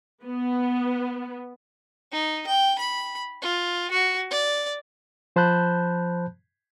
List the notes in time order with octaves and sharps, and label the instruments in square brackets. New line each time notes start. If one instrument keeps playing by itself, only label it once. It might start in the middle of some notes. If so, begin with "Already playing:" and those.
[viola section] B3
[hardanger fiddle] D#4
G5
B5
F4
F#4
D5
[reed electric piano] F3 C5 A5 B5 F#6 G6